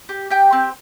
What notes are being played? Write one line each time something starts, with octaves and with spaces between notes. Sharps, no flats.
G4
G4 G5
C4